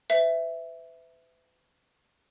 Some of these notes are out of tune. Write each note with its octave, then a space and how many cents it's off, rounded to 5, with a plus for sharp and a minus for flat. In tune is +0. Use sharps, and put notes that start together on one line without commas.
B4 +40 E5 +0